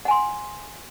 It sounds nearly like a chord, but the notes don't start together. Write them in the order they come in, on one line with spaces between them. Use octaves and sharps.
F#5 G#5 C6